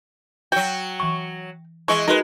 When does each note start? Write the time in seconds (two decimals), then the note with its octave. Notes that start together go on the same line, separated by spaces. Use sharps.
0.52 F#3 F#4 G5
1.00 E3 C#6
1.88 E3 G#3 C#6
2.08 G#3 D#4 F#4 A#4 B4